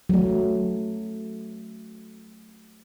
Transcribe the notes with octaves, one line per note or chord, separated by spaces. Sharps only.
F#3 A3